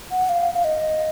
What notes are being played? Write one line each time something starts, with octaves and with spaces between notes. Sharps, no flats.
F#5
F5
F5
D#5